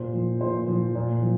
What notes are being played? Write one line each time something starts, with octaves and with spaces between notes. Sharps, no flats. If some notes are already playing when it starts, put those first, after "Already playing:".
Already playing: A#2 C5
F3
A#2 C5
F3
A#2
F3